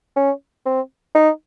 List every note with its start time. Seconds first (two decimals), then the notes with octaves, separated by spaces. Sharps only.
0.16 C#4
0.66 C4
1.15 D#4